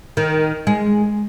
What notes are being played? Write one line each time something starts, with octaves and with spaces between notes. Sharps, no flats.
D#3
G#3